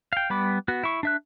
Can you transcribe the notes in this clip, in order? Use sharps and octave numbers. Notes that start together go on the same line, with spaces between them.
F5 G5
G3 B3 B5 D6
B3 F#4
E4 C#6
D4 E5 F#6